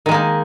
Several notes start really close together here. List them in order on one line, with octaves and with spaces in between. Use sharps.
D#3 G#3 A#3 D#4